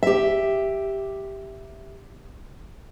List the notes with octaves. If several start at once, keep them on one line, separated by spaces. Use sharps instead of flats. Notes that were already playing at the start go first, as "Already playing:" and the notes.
G4 E5